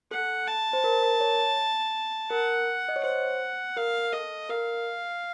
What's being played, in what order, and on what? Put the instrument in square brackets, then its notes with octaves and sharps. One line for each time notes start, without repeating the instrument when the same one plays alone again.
[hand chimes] A4 [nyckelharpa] F#5
[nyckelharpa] A5
[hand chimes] C5
A#4
A#4
C#5
[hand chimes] A#4 [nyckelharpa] F#5
[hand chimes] D#5
C#5
[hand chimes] C5 [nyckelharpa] F#5
[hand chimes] A#4 [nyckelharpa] F5
[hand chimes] A4 [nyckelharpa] D#5
[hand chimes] A#4 [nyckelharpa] F5